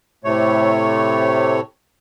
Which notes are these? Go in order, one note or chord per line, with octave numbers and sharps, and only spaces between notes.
A2 C3 A3 C#5